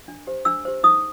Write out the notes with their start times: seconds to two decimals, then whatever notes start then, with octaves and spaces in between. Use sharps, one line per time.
0.08 D4
0.27 G4 C5
0.45 D4 E6
0.65 G4 C5
0.83 D#4 D#6